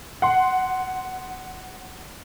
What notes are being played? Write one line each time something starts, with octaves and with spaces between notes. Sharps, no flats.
F#5 C6